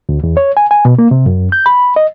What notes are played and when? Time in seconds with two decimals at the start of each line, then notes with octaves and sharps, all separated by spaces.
0.09 D2
0.24 E2
0.37 C#5
0.57 G#5
0.71 G#5
0.85 B2
0.99 A#3
1.11 C3
1.26 F#2
1.52 G6
1.66 B5
1.96 D#5